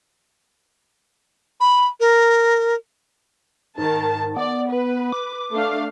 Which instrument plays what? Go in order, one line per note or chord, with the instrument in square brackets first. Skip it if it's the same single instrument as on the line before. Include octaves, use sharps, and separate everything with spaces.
[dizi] B5
A#4
[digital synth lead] G#2 [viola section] D#3 A5
[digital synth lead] B3 [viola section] D5
[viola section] B4
[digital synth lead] D6
[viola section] A3 D4 F5